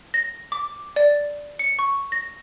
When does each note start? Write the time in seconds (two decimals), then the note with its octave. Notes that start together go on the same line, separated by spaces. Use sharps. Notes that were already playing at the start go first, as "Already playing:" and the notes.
0.14 A#6
0.52 D6
0.96 D5
1.59 C#7
1.79 C#6
2.12 A#6